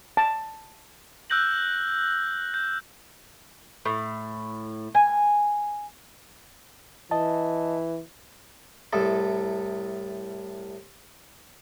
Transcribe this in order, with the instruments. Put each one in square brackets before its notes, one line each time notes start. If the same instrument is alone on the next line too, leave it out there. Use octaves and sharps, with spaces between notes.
[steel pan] A5
[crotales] E6 F#6 G6 A#6 F#7
G6
[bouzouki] A2
G#5
[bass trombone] E3 [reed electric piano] D#5 A5
[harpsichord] C2 A2 A4